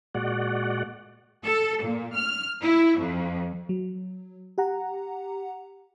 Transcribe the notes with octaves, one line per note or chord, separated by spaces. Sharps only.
A#2 G#3 F#4 D5 F#5
A4
A#2
F6
E4
F2
F#3
G4 F#5 A#5